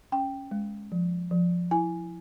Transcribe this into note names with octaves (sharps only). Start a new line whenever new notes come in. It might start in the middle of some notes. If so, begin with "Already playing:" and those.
C#4 G5
G#3
F3
F3
E4 G#5